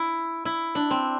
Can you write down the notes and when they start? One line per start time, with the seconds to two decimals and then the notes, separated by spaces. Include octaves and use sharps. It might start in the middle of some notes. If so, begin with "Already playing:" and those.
Already playing: E4
0.45 E4
0.75 D4
0.91 C4